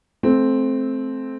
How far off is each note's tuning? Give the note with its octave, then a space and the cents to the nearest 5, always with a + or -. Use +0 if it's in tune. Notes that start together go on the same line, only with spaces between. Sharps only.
A3 -25 C4 +0